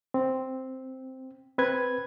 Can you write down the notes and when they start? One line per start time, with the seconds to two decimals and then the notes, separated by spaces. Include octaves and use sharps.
0.14 C4
1.58 C4 B4 G#6